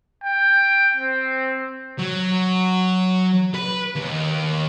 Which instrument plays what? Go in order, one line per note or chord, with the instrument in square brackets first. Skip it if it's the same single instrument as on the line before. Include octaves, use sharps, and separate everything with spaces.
[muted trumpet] G5
C4
[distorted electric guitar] F#3
B4
D#2